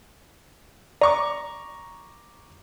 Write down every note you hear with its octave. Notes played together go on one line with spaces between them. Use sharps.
D5 A#5 C#6 D6